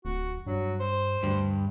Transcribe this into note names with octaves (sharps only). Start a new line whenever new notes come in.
D1 F#4
G2 F#3
C5
D2 G2